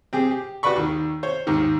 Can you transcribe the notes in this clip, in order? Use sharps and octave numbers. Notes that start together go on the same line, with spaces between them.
C4 G4 G#4
G4
F#4 G4 B4 D5 B5 C#6
D#2 D#3
C5 C#5
D#2 G#2 D#3